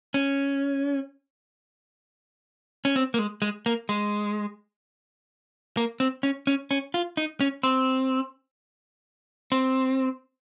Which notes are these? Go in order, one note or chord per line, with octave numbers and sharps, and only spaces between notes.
C#4
C#4
C4
A#3
G#3
G#3
A#3
G#3
A#3
C4
C#4
C#4
C#4
F4
D#4
C#4
C4
C4